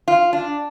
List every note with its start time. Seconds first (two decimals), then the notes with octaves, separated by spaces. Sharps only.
0.08 F4
0.33 D4